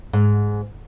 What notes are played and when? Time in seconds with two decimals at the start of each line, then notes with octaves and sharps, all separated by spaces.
0.13 G#2